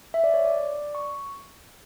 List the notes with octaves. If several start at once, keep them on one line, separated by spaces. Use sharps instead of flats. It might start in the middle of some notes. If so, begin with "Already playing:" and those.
E5
D5
C#5
D5
C#6